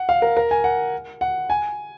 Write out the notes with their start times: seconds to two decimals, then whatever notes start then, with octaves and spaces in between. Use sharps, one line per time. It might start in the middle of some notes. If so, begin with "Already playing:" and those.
Already playing: F#5
0.09 F5
0.22 A#4
0.37 A#4
0.51 G#5
0.64 F#5
1.21 F#5
1.50 G#5